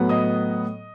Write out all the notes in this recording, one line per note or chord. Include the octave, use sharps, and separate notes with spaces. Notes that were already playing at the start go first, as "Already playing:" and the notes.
Already playing: A2 F#3 B3
D#5 D#6